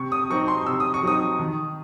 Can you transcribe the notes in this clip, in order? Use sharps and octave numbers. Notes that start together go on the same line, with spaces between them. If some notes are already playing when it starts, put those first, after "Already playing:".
Already playing: C3 C#6
D#6
F#3 C4 D#4 C#6
C6
C3 E6
D#6
C#6
F#3 C4 D#4 D#6
D#3